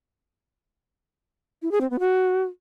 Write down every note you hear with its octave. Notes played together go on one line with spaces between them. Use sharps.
E4
G#4
C4
B3
F#4